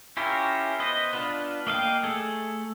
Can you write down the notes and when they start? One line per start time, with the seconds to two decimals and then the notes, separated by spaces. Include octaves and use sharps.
0.17 C#4 E4 F4 G4 A#4
0.80 B3 B4 C5 D#5
1.13 B3 D4 F4 B4
1.67 A#3 D#5 F5 G5
2.03 A3 G#4 A4